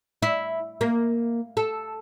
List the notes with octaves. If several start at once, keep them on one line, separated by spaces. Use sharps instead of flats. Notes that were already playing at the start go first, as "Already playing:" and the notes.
E4
A#3
A4